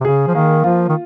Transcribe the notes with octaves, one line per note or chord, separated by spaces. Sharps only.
C3
C#3 G#4
F3
D#3 A#3
F3 F4
D#3